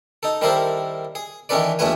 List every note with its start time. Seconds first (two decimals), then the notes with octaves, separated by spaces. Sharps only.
0.23 D#4 A4
0.41 D#3 G3 E4 A4 A#4 C5
1.15 G#4
1.49 D#3 E3 C#4 A4 B4 D5
1.79 E2 G2 A#2 A3 B4 G#5